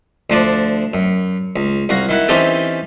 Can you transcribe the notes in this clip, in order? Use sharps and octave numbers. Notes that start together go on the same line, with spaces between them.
D2 F3 D4 D5
F#2
C#2
C2 F#4 F5 A#5
D#3 E4 F#5
E3 C4 C#4 D#4 G4 A4